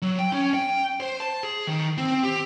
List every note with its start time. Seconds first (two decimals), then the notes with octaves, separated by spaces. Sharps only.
0.02 F#3
0.19 G5
0.32 C#4
0.54 G5
1.00 C5
1.20 A5
1.43 G#4
1.67 D#3
1.98 C4
2.24 G4